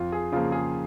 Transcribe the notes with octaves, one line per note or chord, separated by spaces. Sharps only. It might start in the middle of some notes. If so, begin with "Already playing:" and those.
Already playing: F2 F4
G#4
C#3 F3 A#3 F4
G#4